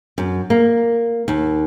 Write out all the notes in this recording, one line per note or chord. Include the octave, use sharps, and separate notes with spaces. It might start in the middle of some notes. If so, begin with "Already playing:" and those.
F#2
A#3
D#2